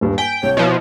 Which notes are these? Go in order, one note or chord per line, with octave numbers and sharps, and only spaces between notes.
D#1 G2
G5 G#5 B6 D7
C2 C#5
B2 F3 E4